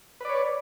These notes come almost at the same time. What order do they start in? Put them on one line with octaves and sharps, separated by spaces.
B4 D5 C#5